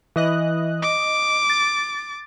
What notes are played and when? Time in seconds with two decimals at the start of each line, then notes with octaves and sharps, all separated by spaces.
0.16 E3 D#5 F#6
0.83 D#5 D6
1.50 A6